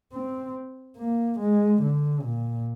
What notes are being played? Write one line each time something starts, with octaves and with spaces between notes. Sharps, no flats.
C4
A#3
G#3
D3
A#2